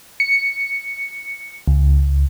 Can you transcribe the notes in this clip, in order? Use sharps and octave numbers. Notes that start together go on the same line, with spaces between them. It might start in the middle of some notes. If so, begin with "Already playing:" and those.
C#7
C#2